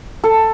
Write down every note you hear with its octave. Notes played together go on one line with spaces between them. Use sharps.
A4